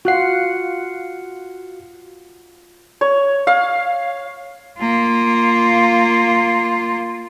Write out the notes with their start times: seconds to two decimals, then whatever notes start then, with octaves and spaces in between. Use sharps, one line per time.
0.05 F4 F#4 F#5 F#6 C7
3.01 C#5
3.47 F5
4.79 A#3 F4